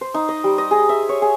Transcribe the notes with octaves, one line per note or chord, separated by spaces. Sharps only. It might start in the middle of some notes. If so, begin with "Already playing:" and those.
C5
D#4
D#5
G3
D#5
G#4
E5
C#5
G#4